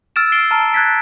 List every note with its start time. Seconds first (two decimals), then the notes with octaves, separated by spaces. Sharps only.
0.16 E6 F6 A6 D7 E7
0.32 A6 C7 D7 G7
0.51 A5 A#5 F6
0.73 F#6 G#6 A6 B6 D7